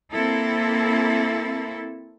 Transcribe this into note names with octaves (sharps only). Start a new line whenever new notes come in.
A#3 C4 E4 A4